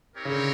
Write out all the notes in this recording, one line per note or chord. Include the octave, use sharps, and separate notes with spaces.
C4 D#4 G4 A#4 C#5
C#3
D3